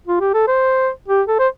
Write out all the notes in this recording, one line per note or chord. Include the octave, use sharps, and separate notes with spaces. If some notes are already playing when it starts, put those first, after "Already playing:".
F4
G4
A4
C5
G4
A4
C5